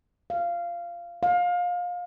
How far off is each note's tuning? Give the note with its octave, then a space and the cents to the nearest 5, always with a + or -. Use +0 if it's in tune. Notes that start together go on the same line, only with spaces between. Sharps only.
F5 -15
F5 +25